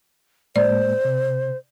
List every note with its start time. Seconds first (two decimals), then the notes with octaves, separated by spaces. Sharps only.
0.56 A2 G#3 A#3 C5 D5
1.05 C3